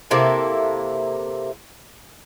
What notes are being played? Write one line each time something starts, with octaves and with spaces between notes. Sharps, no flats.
C3 A#3 E4 A4